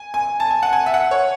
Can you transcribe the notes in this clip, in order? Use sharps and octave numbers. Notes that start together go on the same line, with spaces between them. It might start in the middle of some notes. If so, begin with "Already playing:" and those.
Already playing: G#5
G#5
A5
G#5
F#5
G#5
E5
F#5
C#5